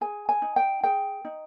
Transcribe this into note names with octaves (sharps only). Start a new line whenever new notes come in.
G#4 G#5
G#5
D#4
G5
G#4 G5
D#4